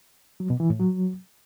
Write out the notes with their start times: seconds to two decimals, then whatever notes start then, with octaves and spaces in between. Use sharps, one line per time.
0.40 F#3
0.50 B2
0.60 E3
0.70 A2
0.80 F#3